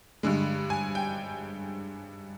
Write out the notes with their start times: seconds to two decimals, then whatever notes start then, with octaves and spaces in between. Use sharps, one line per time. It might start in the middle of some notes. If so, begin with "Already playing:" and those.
0.23 G2 D3 G#3
0.70 G#5
0.95 G5